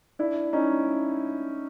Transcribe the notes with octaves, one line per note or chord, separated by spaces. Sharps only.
D4 E4
C#4 D#4